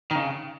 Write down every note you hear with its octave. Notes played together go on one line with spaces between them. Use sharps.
D#3
C#3